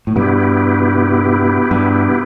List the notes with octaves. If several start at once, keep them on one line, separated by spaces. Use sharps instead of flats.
A2
G2 B2 B3 E4 G4
G2